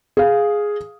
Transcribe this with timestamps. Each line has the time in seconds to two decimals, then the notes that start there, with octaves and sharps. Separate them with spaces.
0.17 G#4 F5